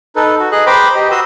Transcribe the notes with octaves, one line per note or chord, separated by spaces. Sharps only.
D#4 A4 B4
F#4
G#4 D#5 F#6
B4 C5 G5 A#5 B5 D6
G4 D#5
F#4 B4 A#5 C6 D#6 E6